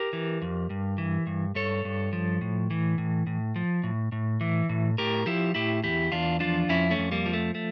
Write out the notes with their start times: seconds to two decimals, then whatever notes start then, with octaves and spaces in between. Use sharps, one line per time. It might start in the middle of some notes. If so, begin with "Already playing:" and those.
Already playing: G4 A#4
0.13 E3
0.42 F2
0.70 G2
0.98 E3
1.27 G2
1.55 G2 A4 C#5
1.85 G2
2.13 F3
2.41 A2
2.70 E3
2.98 A2
3.27 A2
3.56 F3
3.83 A2
4.12 A2
4.41 E3
4.69 A2
4.98 A2 G4 A#4
5.26 F3 E4 G4
5.55 A2 E4 G4
5.84 E2 E4 G4
6.12 E2 D4 F4
6.40 F3 D4 F4
6.69 F2 C#4 E4
6.90 A3 C#4
6.98 F2
7.12 G3 A#3
7.26 F3
7.33 A3
7.55 A3